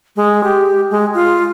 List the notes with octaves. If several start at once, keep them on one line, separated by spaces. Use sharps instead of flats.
G#3
G4
G#3
F4